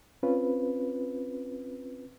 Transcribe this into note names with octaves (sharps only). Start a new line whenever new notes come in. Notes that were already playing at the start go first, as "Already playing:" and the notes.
C4 C#4 F4 B4